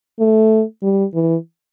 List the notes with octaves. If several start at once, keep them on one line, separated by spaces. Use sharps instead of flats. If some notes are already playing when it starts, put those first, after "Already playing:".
A3
G3
E3